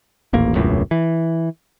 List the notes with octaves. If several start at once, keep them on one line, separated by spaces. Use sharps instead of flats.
D#1 A1 A#3
E1 C#2 F#2 A2
E3